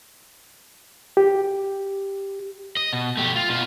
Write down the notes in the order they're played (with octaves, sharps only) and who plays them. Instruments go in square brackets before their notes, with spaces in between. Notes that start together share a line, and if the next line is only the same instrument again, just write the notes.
[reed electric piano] G4
[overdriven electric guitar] D#5
B2
A3 G4
F4
B2 F4